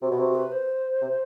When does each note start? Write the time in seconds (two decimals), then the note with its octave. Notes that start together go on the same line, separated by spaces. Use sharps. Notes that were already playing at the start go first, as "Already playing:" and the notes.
0.02 C3 F#4
0.11 B2
0.18 C3 F#4
0.35 B4
0.52 C5
1.02 C3